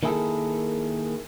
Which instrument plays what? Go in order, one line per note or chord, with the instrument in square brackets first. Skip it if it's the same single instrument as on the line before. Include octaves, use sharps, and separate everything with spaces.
[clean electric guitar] D#3 A#3 E4 G#4 A4